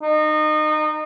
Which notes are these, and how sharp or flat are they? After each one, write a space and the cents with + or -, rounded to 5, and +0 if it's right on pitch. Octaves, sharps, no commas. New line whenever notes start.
D#4 -25